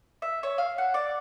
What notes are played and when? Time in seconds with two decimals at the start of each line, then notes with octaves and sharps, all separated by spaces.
0.22 E5
0.43 C#5
0.58 F5
0.78 F#5
0.94 D5